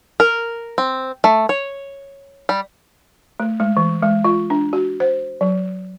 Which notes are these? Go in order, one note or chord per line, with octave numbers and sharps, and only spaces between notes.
A#4
C4
A3
C#5
G3
A3
G#3
E3
G#3
F4
D4
F#4
C5
F#3